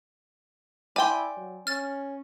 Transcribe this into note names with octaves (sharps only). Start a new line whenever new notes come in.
E4 D5 G5 G#5 C6
F#3
C#4 F6 A6